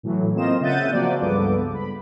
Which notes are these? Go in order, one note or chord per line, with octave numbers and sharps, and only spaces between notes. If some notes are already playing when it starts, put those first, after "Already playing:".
A2 E3 F#3
A#3 C4 F4 D#5 E7
C#3 E5 F#5 G6 A6 D#7
F3 A#3 C4 F#4 D5
C#2 G2 B3 A4 D6
B5